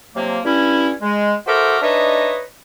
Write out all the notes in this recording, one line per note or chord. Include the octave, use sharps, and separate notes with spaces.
C3 F3 F#3 A#3
G2 C#4 E4
G#3
F#4 A4 A#4 C5 E5 D6
D4 D#4 B4 C#5 D#5 E5